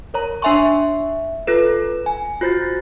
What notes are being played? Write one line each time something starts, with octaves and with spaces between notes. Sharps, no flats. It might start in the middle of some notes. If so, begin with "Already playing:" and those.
A#4 C#5 A#5
D4 C#5 E5 G#5 C6 C#6
E5
F4 A4 B4
G#5
F4 F#4 C5 G6 A6